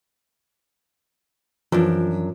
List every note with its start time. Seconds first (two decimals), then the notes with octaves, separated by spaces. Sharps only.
1.72 F#2 E3 F3 D4